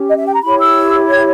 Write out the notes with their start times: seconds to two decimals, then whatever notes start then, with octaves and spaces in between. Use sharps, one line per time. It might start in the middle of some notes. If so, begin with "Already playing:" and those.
Already playing: C#4 G4
0.09 D#5
0.18 E5
0.25 G5
0.34 A#5
0.43 E4 G4 C#5 B5
0.59 E6
1.10 G#6